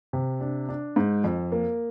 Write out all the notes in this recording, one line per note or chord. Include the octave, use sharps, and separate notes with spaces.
C3
D4
D4
G#2
F2
A#3